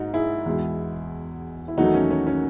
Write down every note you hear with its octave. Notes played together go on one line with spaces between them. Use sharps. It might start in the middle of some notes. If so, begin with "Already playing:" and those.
Already playing: G#2 D#4 F#4
E4 G#4
E2 B2 G#3
E4
E2 D#3 F#3 A3 D#4 F#4
C#4
C#4
C#4